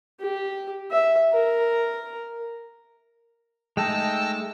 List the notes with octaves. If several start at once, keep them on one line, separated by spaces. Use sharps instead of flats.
G4
E5
A#4
G#3 A3 D#4 G5 A5 E6 A#6